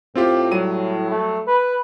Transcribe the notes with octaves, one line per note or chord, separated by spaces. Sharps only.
A2 C4 F4 G4
F#3 G3 D#7
A3
B4